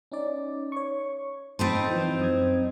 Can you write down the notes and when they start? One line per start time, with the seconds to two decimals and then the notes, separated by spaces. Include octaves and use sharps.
0.12 C#4 D#4 D5
0.72 C#5 C#6
1.59 C4 D#4 C5 A5 B5 A6
1.90 E3 F3
2.19 F#2 D#6 G#6